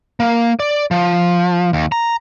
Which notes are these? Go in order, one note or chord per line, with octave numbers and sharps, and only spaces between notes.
A#3
D5
F3
D#2
A#5